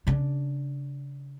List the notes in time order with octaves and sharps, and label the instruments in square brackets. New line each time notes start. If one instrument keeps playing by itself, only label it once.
[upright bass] C#3 D4